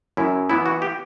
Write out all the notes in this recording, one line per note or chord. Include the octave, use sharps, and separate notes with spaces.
F#2 E4
E3 B3 E4
F#4
G4